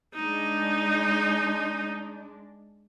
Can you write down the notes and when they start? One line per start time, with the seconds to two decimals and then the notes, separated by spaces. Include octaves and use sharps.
0.15 G#3 D4 D#4